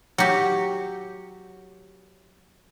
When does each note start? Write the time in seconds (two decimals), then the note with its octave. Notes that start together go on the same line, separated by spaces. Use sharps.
0.18 F#3 G4